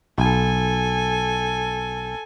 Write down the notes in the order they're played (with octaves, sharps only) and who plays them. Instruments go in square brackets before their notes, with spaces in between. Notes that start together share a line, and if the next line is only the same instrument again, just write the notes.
[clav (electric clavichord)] B1 [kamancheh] A4 G#5